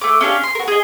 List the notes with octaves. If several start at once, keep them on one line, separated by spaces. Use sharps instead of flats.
A3 D6
C#4 D4 G4 F5
C6
F#4 A#4
G#4 D#5